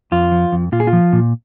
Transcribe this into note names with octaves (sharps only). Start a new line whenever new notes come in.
F2 F4
F3
F2
A#2 F4
G#4
F4
F3
A#2